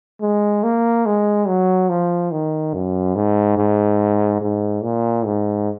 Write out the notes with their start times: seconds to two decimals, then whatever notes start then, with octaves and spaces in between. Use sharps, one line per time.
0.22 G#3
0.63 A#3
1.06 G#3
1.47 F#3
1.89 F3
2.32 D#3
2.73 F#2
3.15 G#2
3.57 G#2
4.41 G#2
4.83 A#2
5.25 G#2